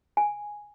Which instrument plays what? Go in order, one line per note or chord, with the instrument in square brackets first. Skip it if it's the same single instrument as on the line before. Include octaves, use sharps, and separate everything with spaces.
[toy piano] G#5